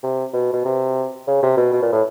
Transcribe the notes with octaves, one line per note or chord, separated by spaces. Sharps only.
C3
B2
B2
C3
C#3
C3
B2
B2
A#2
A2